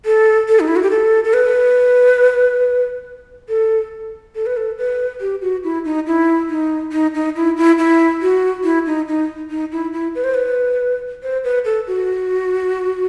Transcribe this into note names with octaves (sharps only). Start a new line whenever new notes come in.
A4
A4
D#4
E4
F#4
G4
A4
A4
B4
A4
A4
B4
A4
B4
G4
F#4
E4
D#4
E4
D#4
D#4
D#4
E4
E4
E4
F#4
E4
D#4
D#4
D#4
E4
E4
B4
C5
B4
C5
B4
A4
F#4